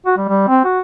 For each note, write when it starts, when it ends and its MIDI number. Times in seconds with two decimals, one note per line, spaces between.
0.06 0.16 66
0.17 0.27 55
0.29 0.45 55
0.48 0.61 60
0.64 0.80 66